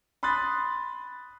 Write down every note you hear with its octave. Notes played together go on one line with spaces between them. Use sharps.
B5 C6 D#6 F#6 A6